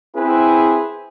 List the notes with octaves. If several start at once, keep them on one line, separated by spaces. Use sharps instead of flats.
C4 E4 G#4 B4